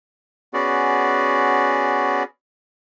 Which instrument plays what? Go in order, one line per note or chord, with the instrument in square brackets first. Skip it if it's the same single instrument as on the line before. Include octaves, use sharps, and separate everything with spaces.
[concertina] B3 C#4 F#4 G#4 D5